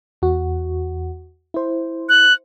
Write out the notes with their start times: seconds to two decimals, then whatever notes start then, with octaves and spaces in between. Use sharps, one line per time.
0.22 E2 F#4
1.54 E4 C5
2.09 F#6